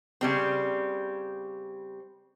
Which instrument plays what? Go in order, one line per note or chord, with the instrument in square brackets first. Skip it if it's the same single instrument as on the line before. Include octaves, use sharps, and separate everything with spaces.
[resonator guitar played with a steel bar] C#3 G3 C4